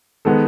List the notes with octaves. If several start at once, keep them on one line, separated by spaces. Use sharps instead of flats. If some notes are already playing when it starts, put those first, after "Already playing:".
D#3 G#3 B3 A4